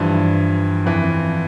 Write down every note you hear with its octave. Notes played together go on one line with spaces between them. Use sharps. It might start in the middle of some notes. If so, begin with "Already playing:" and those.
Already playing: G2 E3 F3
F2 E3